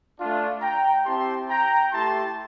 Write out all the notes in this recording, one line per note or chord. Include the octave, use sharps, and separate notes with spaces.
A3 D4 F4
G5 A#5
C4 E4 G4 A5 C6
G5 A#5
A3 E4 G4 A5 C6